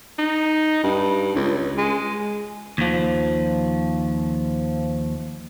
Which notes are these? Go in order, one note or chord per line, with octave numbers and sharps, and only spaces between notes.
D#4
G2
C#2
G#3
D#2 F3